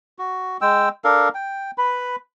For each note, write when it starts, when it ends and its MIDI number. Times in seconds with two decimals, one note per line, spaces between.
0.19 0.57 66
0.61 0.89 56
0.61 0.89 79
0.61 0.89 88
1.04 1.29 62
1.04 1.29 69
1.04 1.29 70
1.04 1.29 77
1.35 1.71 79
1.78 2.16 71
1.78 2.16 83